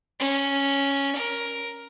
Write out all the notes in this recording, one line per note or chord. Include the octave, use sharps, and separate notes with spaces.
C#4
A#4